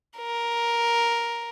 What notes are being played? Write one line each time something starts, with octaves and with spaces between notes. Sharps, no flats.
A#4